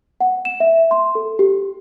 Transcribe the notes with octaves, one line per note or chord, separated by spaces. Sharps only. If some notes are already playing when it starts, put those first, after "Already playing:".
F#5
E7
E5
C6
A4
G4